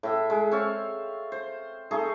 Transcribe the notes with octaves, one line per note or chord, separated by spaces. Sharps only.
A2 E5
G#3
C4 C#5 F5 A5
C5
A3 D#4 G#4